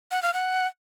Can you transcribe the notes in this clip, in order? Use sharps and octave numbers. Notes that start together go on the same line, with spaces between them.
F#5
F5
F#5